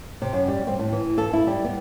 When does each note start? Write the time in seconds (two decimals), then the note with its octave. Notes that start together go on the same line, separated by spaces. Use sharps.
0.22 C3
0.33 F#2
0.48 G3
0.67 C4
0.79 A2
0.92 E3
1.18 A4
1.33 E4
1.47 G3
1.64 B3